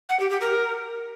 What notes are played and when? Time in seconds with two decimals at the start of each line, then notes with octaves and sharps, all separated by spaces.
0.09 F#5
0.20 G4
0.30 G4
0.41 A#4